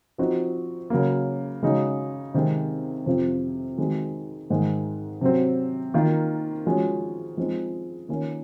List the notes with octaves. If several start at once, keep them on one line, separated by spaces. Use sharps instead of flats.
F3 C4 D#4 F#4
C#3 F#3 A#3
C#3 G#3 D#4 F#4
C3 D#3 G#3 C4
F2 C3 F3 C4 F4
D#3 G#3 C4 F#4
G#2 D#3 G#3
C3 F#3 C4
D#3 A#3 F4
F3 G#3 C#4 F#4
F3 G#3 C4 D#4
D#3 A#3 C#4 F4